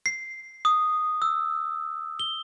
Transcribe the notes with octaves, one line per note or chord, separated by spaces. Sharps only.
C7
D#6
E6
G7